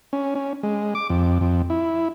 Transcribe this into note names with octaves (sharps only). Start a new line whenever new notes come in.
C#4
C#4
G#3
D6
F2
F2
E4